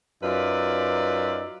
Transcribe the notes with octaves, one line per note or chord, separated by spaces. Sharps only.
F#2 D#4 F4 B4 D5 E5